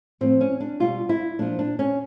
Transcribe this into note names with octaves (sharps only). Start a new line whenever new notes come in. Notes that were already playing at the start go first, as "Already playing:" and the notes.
A2 F3 C4
C#4
D4
B2 G3 F4
E4
A#2 F3 D4
D4
C#4